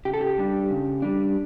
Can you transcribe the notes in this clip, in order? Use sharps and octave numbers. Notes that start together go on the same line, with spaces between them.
C#3 G4
A4
G4
G3 D4
C#3
G3 D4